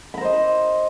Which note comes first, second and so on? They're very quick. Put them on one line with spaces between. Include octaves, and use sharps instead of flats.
B5 A#5 C5 D#5